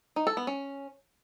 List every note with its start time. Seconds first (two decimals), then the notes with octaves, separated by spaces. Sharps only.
0.16 D#4
0.27 A4
0.37 B3
0.47 C#4